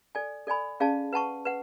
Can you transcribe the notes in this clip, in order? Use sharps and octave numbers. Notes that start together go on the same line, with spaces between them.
A4 D5 G#5
A4 D5 G#5 B5
C#4 G#4 D5 F5 A5
B4 F#5 A5 C#6
B4 F#5